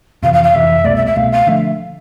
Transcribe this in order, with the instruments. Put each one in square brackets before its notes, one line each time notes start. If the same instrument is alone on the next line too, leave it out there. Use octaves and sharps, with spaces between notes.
[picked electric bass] F2 C3 E3 [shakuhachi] F5
[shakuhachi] F5
F5
[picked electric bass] F2 C3 E3 [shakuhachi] E5
[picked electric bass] C2 B2 A3 [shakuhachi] D5
[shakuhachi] E5
E5
[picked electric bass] C2 B2 A3 [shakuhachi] F5
[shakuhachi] F5
[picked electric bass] D3 F3 A3 [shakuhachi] E5